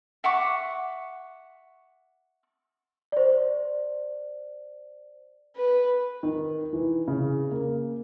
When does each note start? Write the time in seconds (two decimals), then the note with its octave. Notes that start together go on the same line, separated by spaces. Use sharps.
0.24 E5 F#5 C#6 D6
3.12 C5 D5
5.56 B4
6.23 D#3
6.73 E3
7.08 C#3
7.51 A#3